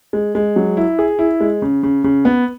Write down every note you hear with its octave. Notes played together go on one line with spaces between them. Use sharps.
G#3
G#3
F#3
E4
G#4
E4
G#3
C#3
C#3
C#3
B3